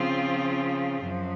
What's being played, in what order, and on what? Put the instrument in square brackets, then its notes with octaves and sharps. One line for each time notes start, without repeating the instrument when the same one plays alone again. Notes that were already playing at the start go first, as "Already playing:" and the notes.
Already playing: [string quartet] C#3 F3 C4 F4
F#2 F3